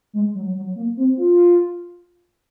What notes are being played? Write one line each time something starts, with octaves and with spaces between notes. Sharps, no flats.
G#3
F#3
F#3
A#3
C4
F4